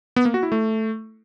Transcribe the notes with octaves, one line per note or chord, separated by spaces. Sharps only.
B3
A#3
F#4
E4
A3